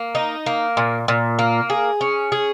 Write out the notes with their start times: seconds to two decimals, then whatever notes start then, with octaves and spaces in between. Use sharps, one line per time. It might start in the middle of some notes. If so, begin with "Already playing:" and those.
Already playing: A#3
0.15 D#4
0.46 A#3
0.77 A#2
1.08 A#2
1.39 A#3
1.70 G#4
2.01 C#4
2.32 G#4